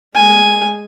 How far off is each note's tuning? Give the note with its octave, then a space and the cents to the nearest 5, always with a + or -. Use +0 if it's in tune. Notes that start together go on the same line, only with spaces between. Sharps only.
G#3 +0 G#5 +0